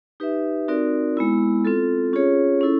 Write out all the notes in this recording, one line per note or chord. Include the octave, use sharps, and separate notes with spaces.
D#4 G4 B4 E5
C4 D#4 F#4 A#4 D5
G#3 B3 E4
C4 F4 A4
C#4 F4 G#4 C#5
C#4 E4 A4